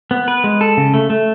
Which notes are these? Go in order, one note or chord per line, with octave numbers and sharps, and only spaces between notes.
B3
B4
G#3
A4
C#3
A3
A3